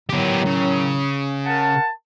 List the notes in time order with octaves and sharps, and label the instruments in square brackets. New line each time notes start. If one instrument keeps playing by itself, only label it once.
[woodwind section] A2 D#3 F#3 [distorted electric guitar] B3 G4
[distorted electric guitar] C#3
[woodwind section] A#4 F#5 A5